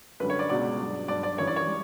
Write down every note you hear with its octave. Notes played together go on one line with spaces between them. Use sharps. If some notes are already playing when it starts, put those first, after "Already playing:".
F#2 D3 G3 B4
C#5
D5
C#2 B2 F#3 D5
G2 F#3
G2 F#3 D5
D5
F#2 E3 G3 C#5
D5
C#5
G3